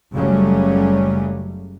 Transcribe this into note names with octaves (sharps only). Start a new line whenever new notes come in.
F#1 C#3 F#3 G3 A3 C#4